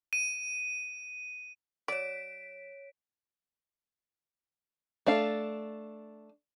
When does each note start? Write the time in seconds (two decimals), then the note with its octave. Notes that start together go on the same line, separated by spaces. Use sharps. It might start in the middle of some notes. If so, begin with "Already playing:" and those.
0.13 D#7
1.88 F#3 C#5 D5 B6 D7
5.06 A3 D4 F5